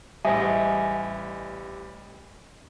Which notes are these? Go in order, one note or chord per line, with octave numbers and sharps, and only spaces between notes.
A1 G3 C5 D#5 E5 G#5 D#6